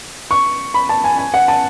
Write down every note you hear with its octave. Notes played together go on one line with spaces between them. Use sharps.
C#6
B5
A5
G#5
G#5
F#5
A5